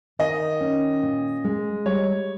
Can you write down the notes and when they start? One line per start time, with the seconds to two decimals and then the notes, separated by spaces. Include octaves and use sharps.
0.19 D#3 D#5
0.61 C#4
1.02 A#2
1.44 G#3
1.86 G3 C#5